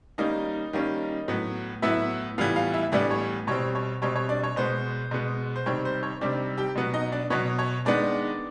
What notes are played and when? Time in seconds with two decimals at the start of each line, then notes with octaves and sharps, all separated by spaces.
0.18 D#3 G3 A#3 C#4 D#4 D#5
0.73 D#3 G3 A#3 C#4
1.28 A2 F#3 B3
1.82 A2 F#3 B3 E4 E5
2.38 A2 E3 G3 B3 F4 F5
2.56 F4 F5
2.73 E4 E5
2.92 A2 E3 G3 B3 D4 D5
3.11 C#5
3.47 B2 G3 C4 C#5
3.75 C#5
4.02 B2 G3 C4 C#5
4.16 C#5
4.29 D4 D5
4.43 C#5
4.56 B2 G#3 B3 C5
5.11 B2 G#3 B3
5.56 C5
5.66 C3 D#3 G3 C4 C#5
5.85 C5
6.03 C#5
6.21 C3 D#3 G3 C4 D4 D5
6.58 G4 G5
6.75 B2 F#3 B3
6.94 D#4 D#5
7.12 D4 D5
7.30 B2 F#3 B3 C#5
7.59 C#5
7.85 D#3 G#3 B3 D4 D5